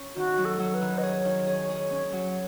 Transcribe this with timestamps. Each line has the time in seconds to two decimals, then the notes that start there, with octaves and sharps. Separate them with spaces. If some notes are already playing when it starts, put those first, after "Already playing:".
Already playing: C#4
0.16 D#3 F#4
0.38 F#3
0.45 A4
0.59 F#3
0.74 B4
0.81 D#3
0.98 D#5
1.03 G#4 C#5
1.25 D#3
1.47 G#4
1.70 G#4
1.90 C#4
2.13 F#3